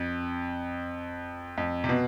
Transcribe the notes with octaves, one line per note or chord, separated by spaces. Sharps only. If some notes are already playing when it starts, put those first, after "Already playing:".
Already playing: F2
F2
C3
B2